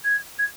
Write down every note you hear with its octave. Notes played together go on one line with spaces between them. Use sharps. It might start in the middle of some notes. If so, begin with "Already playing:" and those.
G#6
G#6